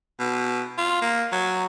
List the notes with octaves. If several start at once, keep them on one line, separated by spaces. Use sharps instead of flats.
B2
F4
A#3
F#3